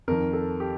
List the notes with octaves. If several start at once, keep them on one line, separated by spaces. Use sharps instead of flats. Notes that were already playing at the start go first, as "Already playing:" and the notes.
F2 D#3 A#4
A4
G4